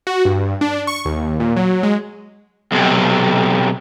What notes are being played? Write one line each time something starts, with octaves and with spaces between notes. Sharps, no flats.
F#4
G2
D4
C#6
D#2
A#2
F#3
G#3
B1 C3